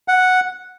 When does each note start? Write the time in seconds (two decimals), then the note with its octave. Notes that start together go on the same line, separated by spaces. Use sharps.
0.08 F#5